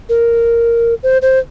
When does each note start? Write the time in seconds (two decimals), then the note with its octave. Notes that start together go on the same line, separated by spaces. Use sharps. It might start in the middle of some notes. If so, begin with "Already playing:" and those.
0.09 A#4
1.03 C5
1.22 C5